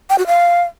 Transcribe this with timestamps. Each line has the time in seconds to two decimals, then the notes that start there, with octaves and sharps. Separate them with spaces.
0.10 G5
0.18 F#4
0.27 F5